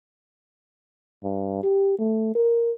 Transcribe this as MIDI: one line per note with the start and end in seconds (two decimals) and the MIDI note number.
1.24 1.59 43
1.63 1.98 67
1.99 2.30 57
2.35 2.71 70